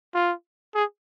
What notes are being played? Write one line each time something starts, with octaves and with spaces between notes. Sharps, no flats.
F4
G#4